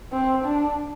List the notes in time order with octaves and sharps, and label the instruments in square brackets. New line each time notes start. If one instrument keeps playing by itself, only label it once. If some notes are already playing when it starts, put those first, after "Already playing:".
[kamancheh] C4
D4